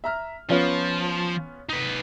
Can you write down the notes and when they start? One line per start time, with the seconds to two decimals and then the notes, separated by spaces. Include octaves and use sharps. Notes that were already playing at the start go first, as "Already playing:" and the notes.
0.04 E5 A#5 F6
0.50 F3 B3 C#4 F4
1.70 D#4 B4